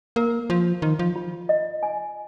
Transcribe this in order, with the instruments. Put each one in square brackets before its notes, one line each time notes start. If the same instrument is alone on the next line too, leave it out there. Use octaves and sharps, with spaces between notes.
[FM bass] A#3 [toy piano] A#4
[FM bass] F3 [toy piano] C6
[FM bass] D#3 [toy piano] C6
[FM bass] F3
[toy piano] F4
D#5
G#5